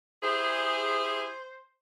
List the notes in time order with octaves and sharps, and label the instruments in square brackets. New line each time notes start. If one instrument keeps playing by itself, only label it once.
[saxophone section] E4 G4 G#4 [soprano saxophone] C5